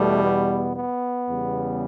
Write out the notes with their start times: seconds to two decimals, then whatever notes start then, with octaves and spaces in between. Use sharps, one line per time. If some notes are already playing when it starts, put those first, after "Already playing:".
Already playing: E2 B2 G3 A3
0.24 B3
0.76 B3
1.29 E2 C#3 G3